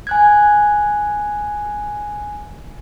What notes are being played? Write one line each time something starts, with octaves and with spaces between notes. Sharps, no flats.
G#5 F#6 G#6